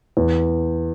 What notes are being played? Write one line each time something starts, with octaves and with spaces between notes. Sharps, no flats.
E2